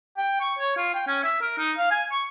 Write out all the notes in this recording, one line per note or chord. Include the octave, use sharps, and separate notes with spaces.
G5
C#6
C#5
F4
G5
C#4
E5
A#4
D#4
F5
G#5
C#6